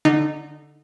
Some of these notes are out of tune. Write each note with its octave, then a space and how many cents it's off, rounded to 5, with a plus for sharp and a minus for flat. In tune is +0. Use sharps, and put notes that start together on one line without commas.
D3 +0 D#4 -20